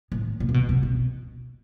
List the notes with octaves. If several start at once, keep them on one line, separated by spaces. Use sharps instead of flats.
A2
A#2
C3
B2
C3
B2